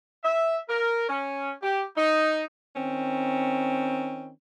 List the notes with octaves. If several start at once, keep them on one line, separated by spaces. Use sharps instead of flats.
E5
A#4
C#4
G4
D#4
D#3 C4 C#4